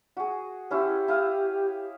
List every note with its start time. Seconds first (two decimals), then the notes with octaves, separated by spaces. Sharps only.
0.17 F#4 G#4
0.71 C#4 E4 G4 C6
1.08 E4 F5 D#6